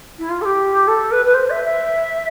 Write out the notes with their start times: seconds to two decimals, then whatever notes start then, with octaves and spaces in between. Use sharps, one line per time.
0.19 E4
0.29 F4
0.41 A4
0.45 G4
0.87 A4
1.12 B4
1.25 B4
1.34 C5
1.50 E5
1.65 E5